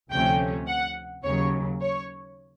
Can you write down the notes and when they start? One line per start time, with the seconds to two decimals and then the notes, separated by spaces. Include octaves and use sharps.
0.10 D2 C3 F3 A3 C#4 G5
0.67 F#5
1.24 D#2 C#3 F#3 C#5
1.81 C#5